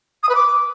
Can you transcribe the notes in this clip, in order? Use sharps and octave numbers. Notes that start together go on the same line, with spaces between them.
D#6
B4
D6